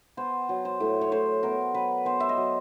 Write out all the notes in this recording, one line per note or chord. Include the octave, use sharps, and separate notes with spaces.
B3 C5
F#3
C5
A2
C#5
A2 C5
B3 A#4
F#3 B4
B3 C5
E5
D#5
F#3